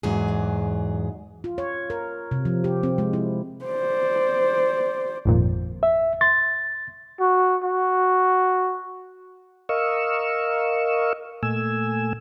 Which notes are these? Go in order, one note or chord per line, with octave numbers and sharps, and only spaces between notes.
E2 G#2 F#3 G#4
F4
C#5
A#4
C3
F3
G4
C4
G#3
E4
C5 D5
G#1 F2 A#2
E5
C6 A6
F#4
F#4
A#4 D#5 F5 C#6 E6
A#2 A3 G#5 E6